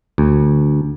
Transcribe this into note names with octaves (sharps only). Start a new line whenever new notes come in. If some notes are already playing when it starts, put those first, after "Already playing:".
D2